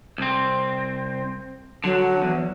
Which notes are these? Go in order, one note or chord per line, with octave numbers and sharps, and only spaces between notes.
C2 C4
D3 F#3
E2